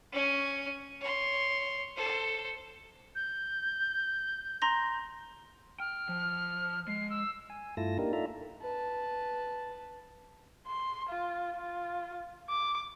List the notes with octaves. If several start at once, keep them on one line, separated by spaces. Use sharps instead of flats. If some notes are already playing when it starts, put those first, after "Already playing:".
C#4 G#5
C#5 C6
A4 C5
G6
A#5 C6 A#6
G5 F6
F3
G#3 C7
E6
G#5
G2 A3 E4 F4 A5 A#6
A#3 D4 D#4 G4 A#4
D#4 F4 A4 D5 E5 A#5
B4 A5
C6
F4
F4
D6